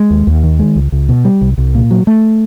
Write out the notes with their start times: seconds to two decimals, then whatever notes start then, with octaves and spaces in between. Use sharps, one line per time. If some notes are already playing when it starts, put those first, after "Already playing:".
Already playing: G#3
0.10 D#2
0.27 D#2
0.44 D#3
0.59 G#3
0.76 C#2
0.92 C#2
1.09 B2
1.25 G3
1.41 C2
1.58 C2
1.75 A#2
1.91 F#3
2.07 A3